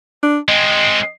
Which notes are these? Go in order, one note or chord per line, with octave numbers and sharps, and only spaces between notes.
D4
G#3 C4 D#5